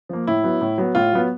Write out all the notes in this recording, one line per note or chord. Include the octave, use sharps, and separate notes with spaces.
F3 A#3
A2 E4
F#3 B3
A2
F#3 B3
A2 F4
F#3 B3